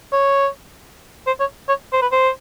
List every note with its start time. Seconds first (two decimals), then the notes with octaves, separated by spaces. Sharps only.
0.13 C#5
1.27 C5
1.40 C#5
1.68 C#5
1.93 C5
2.02 B4
2.12 C5